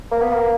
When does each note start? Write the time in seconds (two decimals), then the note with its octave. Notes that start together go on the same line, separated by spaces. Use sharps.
0.11 A#3
0.21 B3
0.33 A#3